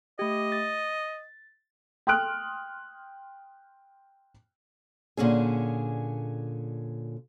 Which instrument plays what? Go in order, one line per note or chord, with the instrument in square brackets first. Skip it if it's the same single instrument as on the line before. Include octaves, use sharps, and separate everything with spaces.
[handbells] A3 G4 [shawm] D#5
[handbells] A6
[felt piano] G5 C6 D#6 F6 F#6 D7
[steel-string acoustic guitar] A#2 D3 C#4 G#4